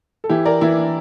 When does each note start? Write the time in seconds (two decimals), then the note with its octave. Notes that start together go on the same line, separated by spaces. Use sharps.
0.24 A4
0.29 E3 E4 G4
0.45 A#4 D5
0.61 E3 E4
0.77 D4